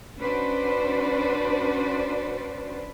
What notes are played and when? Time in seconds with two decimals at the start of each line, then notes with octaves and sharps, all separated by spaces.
0.19 C#4 D4 F#4 B4 C5 D5